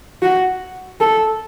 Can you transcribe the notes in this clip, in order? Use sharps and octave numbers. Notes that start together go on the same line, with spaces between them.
F#4
A4